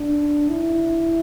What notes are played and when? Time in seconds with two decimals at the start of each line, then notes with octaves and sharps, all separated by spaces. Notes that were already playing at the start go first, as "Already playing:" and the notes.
Already playing: D4
0.49 E4